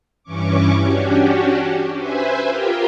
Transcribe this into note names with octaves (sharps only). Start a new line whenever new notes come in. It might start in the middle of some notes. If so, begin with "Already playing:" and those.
G2 E3 C#4 C#6 D6
C#4 D4 F#4 G4
B4 C5 E5 G#5
F4 G4 A#4 G5